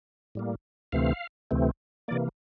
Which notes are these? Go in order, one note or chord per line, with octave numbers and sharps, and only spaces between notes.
A2 G3 A#3
D2 C3 E3 A3 C4 F5
D2 C3 E3 A3 C4
C3 E3 A#3 D5